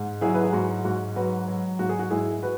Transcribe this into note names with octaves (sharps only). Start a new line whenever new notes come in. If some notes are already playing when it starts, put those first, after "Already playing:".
Already playing: G#2
F#3 E4 G#4
B4
G#4
G#2 F#4
G#2 F#4
F#3 F#4 B4
F#3
G#2 F#4
G#4
F#4
G#2 E4 G#4
F#4 B4